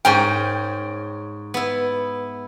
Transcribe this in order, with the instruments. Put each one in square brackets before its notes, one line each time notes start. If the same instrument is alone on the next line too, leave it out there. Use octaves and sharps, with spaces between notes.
[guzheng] G#2 A#4 [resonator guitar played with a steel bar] C#4 G5
[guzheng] B3 E4